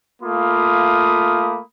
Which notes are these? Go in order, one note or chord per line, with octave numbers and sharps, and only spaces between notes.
A3 A#3 F4 B5 D#6